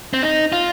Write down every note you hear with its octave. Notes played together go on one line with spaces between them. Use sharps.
C4
D#4
F4